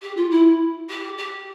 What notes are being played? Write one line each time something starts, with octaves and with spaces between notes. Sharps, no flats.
G4
F4
E4
G4
G4